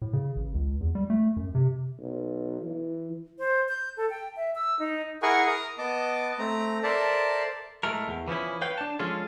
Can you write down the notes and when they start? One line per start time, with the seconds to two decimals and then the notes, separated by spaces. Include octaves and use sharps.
0.02 A2
0.13 C#3
0.36 A1
0.54 C#2
0.81 E2
0.95 G3
1.10 A3
1.37 F#2
1.55 C3
2.00 B1
2.62 E3
3.39 C5
3.69 G6
3.97 A4
4.10 G5
4.36 E5
4.55 E6
4.79 D#4
5.23 E4 G#4 A#4 F#5 G#5 C#6
5.47 A#4 A#5 D#6
5.78 B3 D#5 A5 D6
6.39 A3 C4 A#5
6.83 A4 A#4 C5 D5 E5 A5
7.83 A2 G#3 A3 A#4
8.08 E2
8.28 E3 F3 C#4 E4
8.61 B4 C#5 F5 G5
8.78 D4 A5
8.99 F3 G#3 C#4 F4 G#4 A4